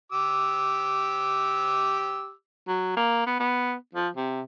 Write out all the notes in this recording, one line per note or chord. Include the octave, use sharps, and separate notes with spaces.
G4 D6 E6
F#3
A#3
B3
B3
F3
C3